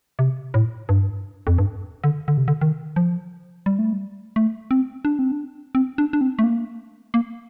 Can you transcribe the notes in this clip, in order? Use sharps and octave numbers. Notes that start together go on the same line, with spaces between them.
C3
A2
G2
F2
G2
D3
D3
C3
D3
D#3
F3
G3
A3
G3
A3
C4
D4
C4
D4
C4
D4
D4
C4
A3
A#3
A#3